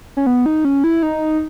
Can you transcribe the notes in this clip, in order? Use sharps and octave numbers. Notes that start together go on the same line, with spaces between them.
C#4
B3
D#4
C#4
E4
D#4